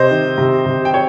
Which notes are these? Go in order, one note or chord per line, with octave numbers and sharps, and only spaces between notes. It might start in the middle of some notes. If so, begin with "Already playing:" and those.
Already playing: C3 C5 D#5
D#3
C3
C3
G5
C#5